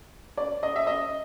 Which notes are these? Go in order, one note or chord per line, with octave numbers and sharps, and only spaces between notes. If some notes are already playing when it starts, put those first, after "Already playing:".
D5
D#5
E5
D#5